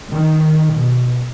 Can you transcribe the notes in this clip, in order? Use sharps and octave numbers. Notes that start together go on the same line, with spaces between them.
D#3
B2